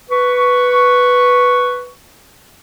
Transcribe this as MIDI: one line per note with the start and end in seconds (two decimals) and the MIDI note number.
0.10 1.90 71
0.10 1.90 85